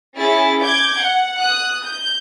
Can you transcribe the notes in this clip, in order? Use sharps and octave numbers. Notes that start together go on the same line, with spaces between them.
C#4 E4 G#4 A6
D6 G6 G#6
F#5
D#6 F#6
G6